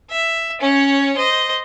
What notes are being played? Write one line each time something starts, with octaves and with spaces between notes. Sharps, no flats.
E5
C#4 C#5
C5 D#5